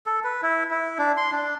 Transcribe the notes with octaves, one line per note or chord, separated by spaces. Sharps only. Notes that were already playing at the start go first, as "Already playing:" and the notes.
A4
B4
E4
E4
D4
C6
D4